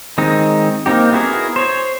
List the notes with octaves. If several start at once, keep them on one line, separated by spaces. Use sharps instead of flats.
D#3 G#3 C4 D#4
A#3 C4 D#4 G4
B3 E4 F#4 G#4 A#4
C5 C#5